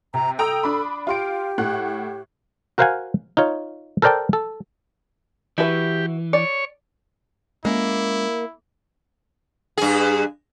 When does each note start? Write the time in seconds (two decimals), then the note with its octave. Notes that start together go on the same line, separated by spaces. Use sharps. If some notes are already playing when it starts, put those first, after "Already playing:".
0.14 C3 A#5
0.39 A4 G5 A#5 D#6
0.63 D4 B5
1.07 F4 G4 C6 D7
1.58 A2 F#5 F#6
2.78 F#4 A#4 C5 F5 F#5 G#5
3.37 D#4 F4 C#5
4.02 A4 A#4 C5 D5 G5 A5
4.33 A4
5.58 E3 E4 F#4 G4 B4
6.33 C#5 D5
7.65 G#3 A#3 C#4 E4
9.77 G2 G#4